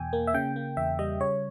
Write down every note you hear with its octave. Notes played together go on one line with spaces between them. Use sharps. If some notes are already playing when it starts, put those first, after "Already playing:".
Already playing: E2 B2 G5 G#5
A#3
E5
C#3 G5
A#3
E2 E5
G3 D#5
C#3 C#5